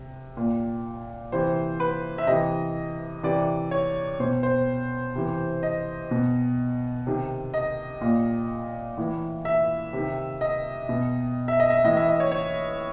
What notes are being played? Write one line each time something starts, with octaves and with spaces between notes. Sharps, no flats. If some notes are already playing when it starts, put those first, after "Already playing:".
Already playing: C3
A#2
C3 E3 C5
B4
E5
C3 E3 D#5
C3 E3 D5
C#5
B2 C5
C5
C3 E3
D#5
B2
C3 D#3
D#5
A#2
A2 E3
E5
C3 D#3
D#5
B2
E5
D#5
E5
A2 E3 D#5
E5
D#5
C#5
C#5